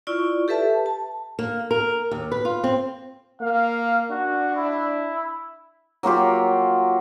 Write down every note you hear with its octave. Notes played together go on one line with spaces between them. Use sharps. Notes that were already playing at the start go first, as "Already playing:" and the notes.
E4 F4 D5 C#6
G4 A4 B4 E5 A5
A5
A#3
A#4
D#2
B4
F4
C4
A#3 F5
D4 F#4
E4
F#3 A#3 F4 G4